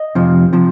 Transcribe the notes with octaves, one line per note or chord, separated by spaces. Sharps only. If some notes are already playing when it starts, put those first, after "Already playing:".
Already playing: D#5
F2 C3 F3
C3 F3